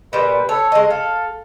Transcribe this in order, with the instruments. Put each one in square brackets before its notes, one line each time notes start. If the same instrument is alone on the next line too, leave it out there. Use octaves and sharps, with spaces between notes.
[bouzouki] A#2 G3 [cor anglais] B4
[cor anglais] A4 [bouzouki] C#5
[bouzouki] G#3 D#5
[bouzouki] A4 [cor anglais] F5